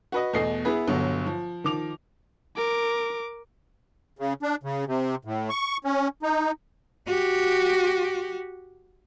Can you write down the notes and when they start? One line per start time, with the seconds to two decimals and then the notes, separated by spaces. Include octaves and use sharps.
0.12 F#4 B4 D#5
0.33 E2 B2 A3 D#5 C7
0.65 B3 E4 G#4 B4
0.88 G1 B2 D3 F#3
1.27 F3
1.64 D#3 F3 D6 F7
2.56 A#4 D6
4.19 C#3
4.43 D4
4.63 C#3
4.87 C3
5.25 A2
5.50 C#6
5.85 C#4
6.23 D#4
7.07 F#4 G4